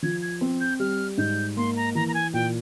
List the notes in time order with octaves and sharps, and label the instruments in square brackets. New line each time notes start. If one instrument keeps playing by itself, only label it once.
[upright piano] F3 [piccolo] G#6
[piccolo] G#6
[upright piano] C4
[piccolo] G6
[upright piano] G3 [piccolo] F6
[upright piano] G#2 [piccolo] G6
[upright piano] A#3 [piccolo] C6
[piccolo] A#5
[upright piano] E3 [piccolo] A#5
[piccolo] A#5
G#5
[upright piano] A#2 [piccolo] G5